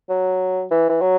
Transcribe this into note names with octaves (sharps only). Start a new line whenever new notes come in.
F#3
E3
E3
F#3